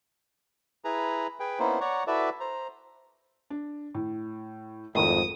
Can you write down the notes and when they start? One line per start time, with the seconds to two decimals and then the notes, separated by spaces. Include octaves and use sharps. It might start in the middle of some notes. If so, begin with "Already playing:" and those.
0.85 E4 G#4 B4 A#5
1.40 G#4 B4 G5
1.59 A#3 B3 C#4 D#4 E4 C5
1.81 C#5 D5 F#5 A#5 C#6
2.07 E4 F#4 A4 B4 D5 E5
2.40 C5 A#5
3.50 D4
3.95 A2
4.95 G#1 F2 A2 D#3 D#6